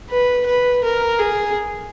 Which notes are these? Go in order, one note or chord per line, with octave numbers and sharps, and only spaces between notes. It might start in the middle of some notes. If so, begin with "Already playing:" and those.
B4
B4
A#4
G#4